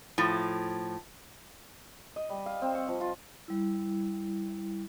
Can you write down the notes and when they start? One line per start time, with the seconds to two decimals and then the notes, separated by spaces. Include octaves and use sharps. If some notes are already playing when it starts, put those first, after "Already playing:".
0.18 A2 F3
2.16 D#5
2.29 G3
2.46 F5
2.62 C4
2.75 C#6
2.88 F3
3.01 F4
3.48 G3 E4